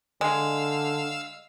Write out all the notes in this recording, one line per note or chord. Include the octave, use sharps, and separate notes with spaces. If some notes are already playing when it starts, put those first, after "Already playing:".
D3 G#3 F5 E6